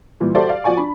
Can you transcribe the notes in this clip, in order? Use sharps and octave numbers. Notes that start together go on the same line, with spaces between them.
A#2 E3 G3
F#4 G4 A4 C5 D5 E5
D5 F5
F3 F#4 D5 G#5 C#6
D4 B5